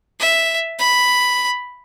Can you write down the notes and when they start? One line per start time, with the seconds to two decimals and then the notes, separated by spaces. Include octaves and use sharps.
0.20 E5
0.79 B5